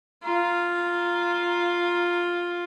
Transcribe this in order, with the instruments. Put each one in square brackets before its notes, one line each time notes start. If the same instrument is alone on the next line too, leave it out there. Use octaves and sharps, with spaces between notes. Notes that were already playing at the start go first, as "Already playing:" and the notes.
[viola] F4 [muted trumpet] A#5